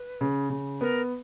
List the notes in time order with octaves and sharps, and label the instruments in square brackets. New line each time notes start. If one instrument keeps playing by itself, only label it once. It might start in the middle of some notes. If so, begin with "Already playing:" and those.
Already playing: [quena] B4
[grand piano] C#3
C#3
[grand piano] B3 [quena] A#4